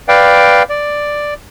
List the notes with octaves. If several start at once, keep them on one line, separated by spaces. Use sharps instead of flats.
B4 D5 F5 G5
D5